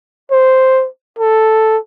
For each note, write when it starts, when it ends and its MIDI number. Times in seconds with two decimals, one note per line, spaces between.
0.31 0.88 72
1.19 1.78 69